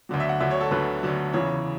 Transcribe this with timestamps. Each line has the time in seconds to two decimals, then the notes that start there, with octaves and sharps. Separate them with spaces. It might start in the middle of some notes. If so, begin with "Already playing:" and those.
0.09 D2 D3 F#3
0.20 E5
0.29 F#5
0.40 D2 D3 F#3 E5
0.51 C#5
0.61 A4
0.71 D2 D3 F#3 B4
1.03 D2 D3 F#3
1.33 E2 C#3 E3 C#5